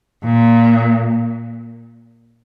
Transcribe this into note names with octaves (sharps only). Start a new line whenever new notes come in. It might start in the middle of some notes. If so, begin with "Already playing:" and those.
A#2